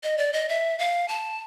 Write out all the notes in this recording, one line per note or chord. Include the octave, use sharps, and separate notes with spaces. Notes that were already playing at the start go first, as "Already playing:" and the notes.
D#5
D5
D#5
E5
F5
A5